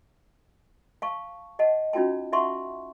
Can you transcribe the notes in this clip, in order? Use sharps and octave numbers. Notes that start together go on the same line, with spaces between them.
F5 A5 C#6
D#5 F#5 A5
C#4 D#4 F4 F#4 G5 A5
E5 F#5 A5 C6 C#6